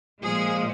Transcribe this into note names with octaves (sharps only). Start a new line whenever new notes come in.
A#2 F3 G#3 G#4